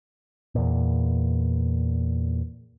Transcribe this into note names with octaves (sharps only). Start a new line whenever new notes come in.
E2 A#2